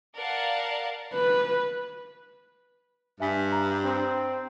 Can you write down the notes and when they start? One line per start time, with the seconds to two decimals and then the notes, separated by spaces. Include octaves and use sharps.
0.15 A#4 D5 F5 F#5 A5
1.14 B4
3.20 G2 E5 G#5 B6
3.52 A#5
3.84 C4